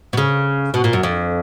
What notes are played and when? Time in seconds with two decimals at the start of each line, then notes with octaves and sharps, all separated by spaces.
0.13 B2
0.17 C#3
0.74 B2
0.84 A#2
0.93 F#2
1.03 F2